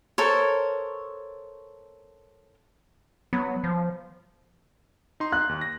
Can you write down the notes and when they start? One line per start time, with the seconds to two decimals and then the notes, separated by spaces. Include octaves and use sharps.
0.18 A4 A#4 C5 C#5
3.33 F#3 B3
3.64 F3
5.20 D#4 C6
5.32 F#6
5.49 D#2
5.61 A#6